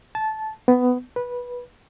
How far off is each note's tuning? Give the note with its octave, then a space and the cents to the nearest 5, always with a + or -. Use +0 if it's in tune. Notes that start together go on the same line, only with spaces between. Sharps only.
A5 -15
B3 +15
B4 -15